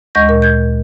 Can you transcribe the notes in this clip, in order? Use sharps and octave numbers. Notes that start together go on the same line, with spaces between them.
D2 G#3 D#5 C#6 G6 A#6
A#2 A#4
G6 G#6